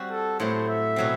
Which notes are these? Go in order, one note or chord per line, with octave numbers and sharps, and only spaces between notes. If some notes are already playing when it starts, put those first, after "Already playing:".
Already playing: G3 C4 F#4
A4
A2 F#3 A3 C5
E5
B2 F#3 C4